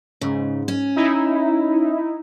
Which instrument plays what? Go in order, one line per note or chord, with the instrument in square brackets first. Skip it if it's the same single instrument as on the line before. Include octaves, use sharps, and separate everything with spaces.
[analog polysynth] G#2 [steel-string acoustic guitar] C#3
[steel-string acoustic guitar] C#4
[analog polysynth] D#4 E4